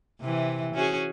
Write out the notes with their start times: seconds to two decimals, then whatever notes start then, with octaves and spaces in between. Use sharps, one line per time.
0.21 C3 E3
0.74 C#4 F#4 G#4